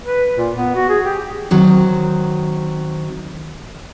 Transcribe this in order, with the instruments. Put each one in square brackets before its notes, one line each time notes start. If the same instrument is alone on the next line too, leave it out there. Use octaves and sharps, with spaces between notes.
[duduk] B4
A#2
B3
F#4
G#4
G4
[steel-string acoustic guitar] D#3 F#3 C4